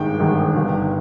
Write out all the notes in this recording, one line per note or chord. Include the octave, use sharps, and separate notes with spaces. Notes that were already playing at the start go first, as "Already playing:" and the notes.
Already playing: G#1 G2 D#3 G#3 G5
G#1 G2 D#3 G#3
G1 G2 D#3